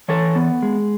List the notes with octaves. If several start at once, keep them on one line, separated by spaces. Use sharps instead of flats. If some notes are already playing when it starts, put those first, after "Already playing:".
E3 A4 C#5
B3
G#3